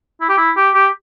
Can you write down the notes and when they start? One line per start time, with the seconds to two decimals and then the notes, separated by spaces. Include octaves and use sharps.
0.21 E4
0.29 G4
0.38 E4
0.57 G4
0.74 G4